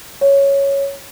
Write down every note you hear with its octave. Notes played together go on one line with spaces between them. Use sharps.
C#5